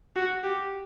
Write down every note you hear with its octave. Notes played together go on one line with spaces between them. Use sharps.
F#4
G4